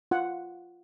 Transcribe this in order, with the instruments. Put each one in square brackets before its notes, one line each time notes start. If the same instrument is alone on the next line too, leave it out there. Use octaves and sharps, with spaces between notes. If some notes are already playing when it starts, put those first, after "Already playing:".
[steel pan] F4 F#5